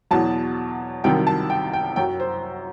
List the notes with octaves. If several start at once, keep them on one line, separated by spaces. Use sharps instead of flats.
E2 B2 F#3 A5
C2 C3 D#3 F#3 G5
A5
G5
G5
F#2 F#3 G5
C5